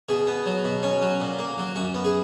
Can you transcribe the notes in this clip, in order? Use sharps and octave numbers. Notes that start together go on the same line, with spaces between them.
B2 G#4
B3
F#3
B2
C#4
F#3
A#2
A#3
F#3
F#2 F#4
B3
G#4